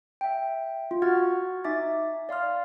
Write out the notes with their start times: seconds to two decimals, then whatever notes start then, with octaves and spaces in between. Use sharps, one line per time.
0.21 E5 G5
0.91 F4
1.02 F#4 F#5 F6 G#6 A6
1.64 D#4 E5 G#5 D6 A6
2.29 D5 F5 C6 F6